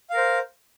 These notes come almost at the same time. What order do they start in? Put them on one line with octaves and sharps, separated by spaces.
F5 A#4 C5